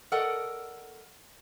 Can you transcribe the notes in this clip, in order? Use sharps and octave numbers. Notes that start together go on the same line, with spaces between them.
A4 A#4 D5 D#5 F#5